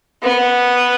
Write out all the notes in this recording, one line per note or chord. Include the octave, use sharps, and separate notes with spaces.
B3